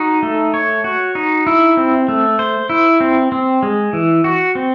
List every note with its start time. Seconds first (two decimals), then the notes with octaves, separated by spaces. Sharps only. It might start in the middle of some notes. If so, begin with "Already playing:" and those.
Already playing: D#4 F#4
0.23 A3
0.54 C#5
0.84 F#4
1.15 D#4
1.47 E4
1.77 C4
2.08 A3
2.39 C5
2.70 E4
3.00 C4
3.32 C4
3.63 G#3
3.93 E3
4.24 F#4
4.55 C4